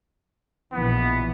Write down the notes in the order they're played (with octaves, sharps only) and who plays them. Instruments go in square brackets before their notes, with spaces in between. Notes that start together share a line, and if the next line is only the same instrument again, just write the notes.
[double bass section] A#1 B2 E3 [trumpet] B3